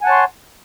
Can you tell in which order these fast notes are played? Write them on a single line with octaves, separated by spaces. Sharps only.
G#5 F#5 A5 C#5 C6